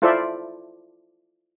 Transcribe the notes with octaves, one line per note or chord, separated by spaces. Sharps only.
E4 F4 A4 C5 D5 E5